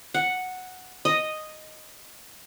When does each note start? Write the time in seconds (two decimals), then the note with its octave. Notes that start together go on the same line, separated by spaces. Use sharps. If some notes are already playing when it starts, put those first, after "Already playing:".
0.14 F#5
1.05 D#5